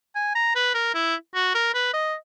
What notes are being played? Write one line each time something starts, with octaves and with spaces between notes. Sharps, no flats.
G#5
A#5
B4
A#4
E4
F#4
A#4
B4
D#5